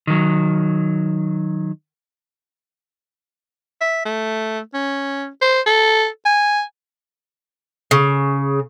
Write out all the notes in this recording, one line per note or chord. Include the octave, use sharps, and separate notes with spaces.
D#3 F#3
E5
A3
C#4
C5
A4
G#5
C#3